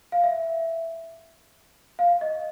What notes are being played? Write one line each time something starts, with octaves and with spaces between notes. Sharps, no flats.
F5
E5
F5
D#5